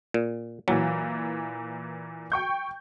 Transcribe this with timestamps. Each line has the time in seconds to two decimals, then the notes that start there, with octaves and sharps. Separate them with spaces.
0.14 A#2
0.68 A#2 E3 F#3
2.32 G5 C#6 G6